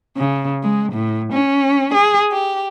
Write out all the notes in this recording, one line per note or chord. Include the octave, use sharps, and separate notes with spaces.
C#3
G#3
A2
C#4
G#4
G4